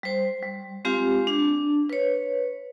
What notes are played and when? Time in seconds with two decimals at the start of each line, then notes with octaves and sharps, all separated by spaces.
0.03 G3 C5
0.43 G3
0.85 G#3 C4 F4 G4 F5
1.27 D4
1.90 B4 C#5